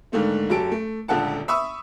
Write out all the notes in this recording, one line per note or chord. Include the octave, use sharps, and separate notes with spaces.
G#2 D3 D#3 A3 A#3
F#1 F#3 G4 A4 D7
A3
D#1 C#2 D3 A4 F#5 A5
E5 B5 C#6 D#6 E6